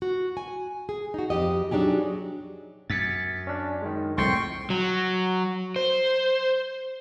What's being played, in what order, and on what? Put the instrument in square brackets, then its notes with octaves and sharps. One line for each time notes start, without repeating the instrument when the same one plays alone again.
[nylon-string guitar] F#4
G#5
G#4
D#4 F#4
F2 G#2 G4 D#5
F#3 D4 D#4 G4 G#4
[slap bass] F#2 [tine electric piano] A6 B6 C#7
[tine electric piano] C#4 D4
D#3 G#3
[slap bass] C2 [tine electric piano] F2 A2 C4 [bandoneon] G5 C6 C#6
[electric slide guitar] F#3
C5